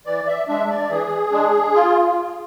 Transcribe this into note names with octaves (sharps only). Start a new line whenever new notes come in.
E3 D5
E5
G#3 D4 E5
D5
E3 G#4
G#3 D4
F4